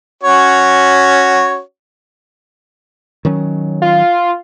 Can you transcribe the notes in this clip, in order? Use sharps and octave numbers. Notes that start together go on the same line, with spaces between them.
C#4 F#4 C#5
D#3 F#3 C#4
F4